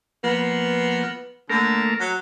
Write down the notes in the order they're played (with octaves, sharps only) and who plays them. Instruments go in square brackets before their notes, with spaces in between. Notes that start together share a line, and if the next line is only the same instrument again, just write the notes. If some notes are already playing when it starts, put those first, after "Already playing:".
[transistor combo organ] F3 A#3 [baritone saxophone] B3
[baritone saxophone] D3 [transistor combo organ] A3 A#3 A#4
[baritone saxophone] F#3